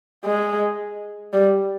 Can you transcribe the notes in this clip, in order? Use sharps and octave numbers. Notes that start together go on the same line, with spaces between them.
G#3
G3